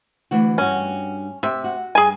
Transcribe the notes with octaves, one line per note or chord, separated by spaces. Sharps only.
D2 E3 F#4
G2 C#4 F#4
C3 E5
F#4
G2 G#4 G#5